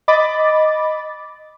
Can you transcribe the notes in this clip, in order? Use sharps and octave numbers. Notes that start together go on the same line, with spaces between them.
D#5 B5 D6 A6